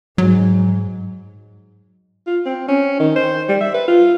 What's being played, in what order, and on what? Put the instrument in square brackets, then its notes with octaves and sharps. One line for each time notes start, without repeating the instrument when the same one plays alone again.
[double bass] G#2 [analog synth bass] F#3
[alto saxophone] F4
C4
C#4
D#3
C5
G3
E5
B4
F4